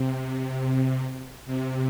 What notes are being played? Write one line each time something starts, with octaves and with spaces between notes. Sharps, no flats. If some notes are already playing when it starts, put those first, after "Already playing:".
Already playing: C3
C3